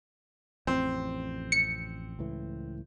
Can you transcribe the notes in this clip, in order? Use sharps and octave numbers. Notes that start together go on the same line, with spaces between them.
A1 F2 C4
C#7
C#2 A2 E3